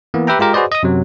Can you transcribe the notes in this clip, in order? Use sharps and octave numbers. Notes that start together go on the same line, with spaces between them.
E3 A#3 B3
G4 B4 E5 G5 A#5
G#3 F4 G4 A#4
F#4 G#4 B4 C5 D5 D#5
D#5 D#6
F#2 C3 F#3